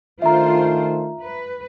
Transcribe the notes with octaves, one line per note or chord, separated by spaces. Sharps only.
D#3 A3 D4 F4 C5 E5 A#5
B4